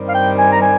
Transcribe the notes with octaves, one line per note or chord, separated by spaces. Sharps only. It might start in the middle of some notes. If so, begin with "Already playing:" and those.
Already playing: G2 D#3 G3 C4
F5
G5
G#5
A#5
G#5